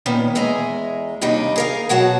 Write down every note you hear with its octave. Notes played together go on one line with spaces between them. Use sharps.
A#2 D#3 B3 C#4
E2 G#3 E5 G#5 A#5
D#2 C3 G3 D4 D#4
G#4 A#4 F5
B2 F#3 F#4 C#5 F#5 A5